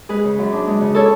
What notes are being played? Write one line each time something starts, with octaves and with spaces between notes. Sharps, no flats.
G#3 G#4 B4
C#3
F#2
D4
G#3
C#3
A4 C#5